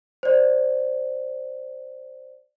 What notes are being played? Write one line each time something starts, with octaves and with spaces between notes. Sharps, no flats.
C5 D5